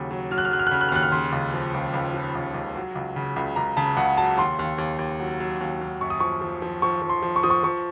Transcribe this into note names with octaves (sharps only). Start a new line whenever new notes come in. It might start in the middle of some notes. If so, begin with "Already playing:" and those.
Already playing: D#2 C#3 F#3
F#3
F#3 F6
F#6
F6
F#3 F#6
F6
F#6
C#3 F6
F#6
F6
D#2 F#6
F6
C#3 C6
C#2
F3
C#2
C#2
F3
C#2
C#2
F#3
C#2
C#3
C#2
C#2 A#5
C#3 A5
C#2 F#5
F#3 A5
D#2 C6
D#2
D#2
D#2
F#3
F#3
D#2
D#2
F#2 C#6
D#6
F3 C#6
F3
F3
F3 C#6
F3
C6
F3
C#6
F3 D#6
C#6
F3 C#6